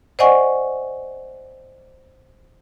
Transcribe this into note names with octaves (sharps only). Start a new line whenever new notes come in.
C5 D5 D#5 F#5 G#5 C#6